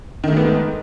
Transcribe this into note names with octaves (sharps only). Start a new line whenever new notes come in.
G#2 D#3 A3 B3